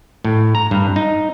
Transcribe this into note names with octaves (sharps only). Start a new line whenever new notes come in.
A2
A#5
G2
D#4